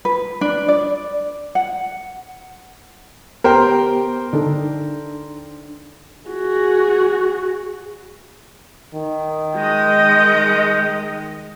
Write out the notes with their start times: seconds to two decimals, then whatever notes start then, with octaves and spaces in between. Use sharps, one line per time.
0.05 B4
0.41 D4
0.68 D5
1.55 F#5
3.44 B3 G4 A#4 C5 G5
4.33 D3 D4 D#4 A4
6.28 F#4 G#4
8.94 D#3
9.56 G#3 D#5 G6